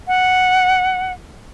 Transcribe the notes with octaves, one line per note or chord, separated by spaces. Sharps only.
F#5